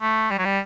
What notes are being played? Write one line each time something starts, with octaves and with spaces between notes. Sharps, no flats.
A3
G3
F#3
G3